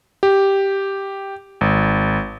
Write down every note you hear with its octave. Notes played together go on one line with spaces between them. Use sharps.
G4
G#1